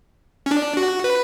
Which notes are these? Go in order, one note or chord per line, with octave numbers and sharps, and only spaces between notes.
C#4
D4
F#4
B4